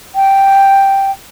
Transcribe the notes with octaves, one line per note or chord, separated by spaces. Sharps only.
G5